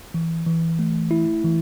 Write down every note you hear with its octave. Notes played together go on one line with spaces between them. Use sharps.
E3
E3
A3
E4
E3